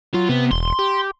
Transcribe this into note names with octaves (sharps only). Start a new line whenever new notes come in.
F#3 F4
C3 B3
E1 C6
G4